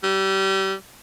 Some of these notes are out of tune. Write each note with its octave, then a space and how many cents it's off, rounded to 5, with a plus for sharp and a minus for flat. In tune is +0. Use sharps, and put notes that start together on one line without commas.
G3 -25